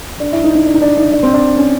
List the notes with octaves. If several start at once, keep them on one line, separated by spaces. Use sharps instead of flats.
D4
E4
D#4
D#4
D4
D#4
D4
D#4
D4
C4
D4
C#4